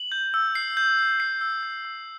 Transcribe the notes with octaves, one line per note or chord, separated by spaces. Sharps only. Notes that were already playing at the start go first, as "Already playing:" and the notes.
Already playing: F#7
G6
E6
C7
G6
G6
C7
E6
G6
E6